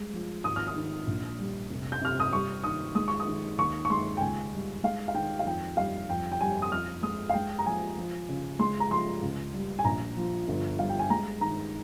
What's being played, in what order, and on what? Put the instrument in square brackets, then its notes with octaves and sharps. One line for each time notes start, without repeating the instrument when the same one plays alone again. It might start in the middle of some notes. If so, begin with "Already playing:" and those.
Already playing: [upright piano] G3 G#3
F3
G#1 D#6
F6
D#6
D#3
A#1
G3
F1
G6
C3 F6
D#6
G3 C#6
D#3 D#6
G#3 D#6
C#6
D#6
D#3
D#2 C#6
C#6
G#3 C6
G5
C#2 G#5
G3
G#3 F5
F5
D#3 G5
F5
F2 G5
G3 F5
F2 G5
G5
G3 G#5
D#6
F2 F6
G#3 D#6
F5
G#3 G5
A#5
F3 G#5
F3
C#3
G#3 C6
A#5
F3 C6
C#2
G3
G#5
A#1 A#5
F3
G1
G3 F5
G5
G#5
G#3 A#5
D#3 A#5